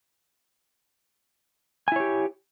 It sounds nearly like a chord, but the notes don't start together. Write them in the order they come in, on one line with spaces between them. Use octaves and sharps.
G#5 E4 C#5 G4